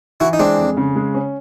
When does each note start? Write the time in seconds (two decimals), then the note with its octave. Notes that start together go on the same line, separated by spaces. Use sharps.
0.20 E3 E4 F#4
0.33 D#4
0.39 G#3 C4 D4
0.58 F2
0.77 C#3
0.96 G#3
1.15 C#4